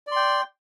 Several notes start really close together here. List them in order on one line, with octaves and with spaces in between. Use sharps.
D5 C6 G5